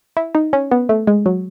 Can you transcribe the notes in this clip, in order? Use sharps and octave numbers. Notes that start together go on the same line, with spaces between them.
E4
D#4
C#4
B3
A3
G#3
F#3